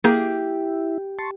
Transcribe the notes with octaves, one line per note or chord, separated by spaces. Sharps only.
A#3 E4 G4 G#4
A5 C6 C#6